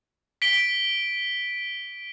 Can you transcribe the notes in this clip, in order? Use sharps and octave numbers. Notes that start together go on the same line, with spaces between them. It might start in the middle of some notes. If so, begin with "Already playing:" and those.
B6 D7 G7